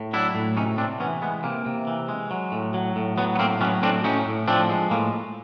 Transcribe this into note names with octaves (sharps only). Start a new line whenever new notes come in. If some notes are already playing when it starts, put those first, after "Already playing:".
Already playing: A2
F#3 D4 E4
A2
C3 C#4 D#4
C3 C4 D4
E3 B3 C#4
G#3 B3
C3 A#3
C3
E3
G#3
F#3
A2
F#3
A2
F#3 B3
B3
A2 A#3 C4
F#3 B3 C#4
A2 C4 D4
A2 C#4 D#4
A2
F3 C4 D4
G#3
A2 A#3